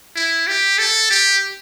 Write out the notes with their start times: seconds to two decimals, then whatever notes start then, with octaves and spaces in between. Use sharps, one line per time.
0.16 E4
0.47 G4
0.79 A4
1.10 G4